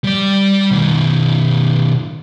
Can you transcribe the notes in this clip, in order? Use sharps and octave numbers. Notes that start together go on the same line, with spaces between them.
G3 D5
B2 D#3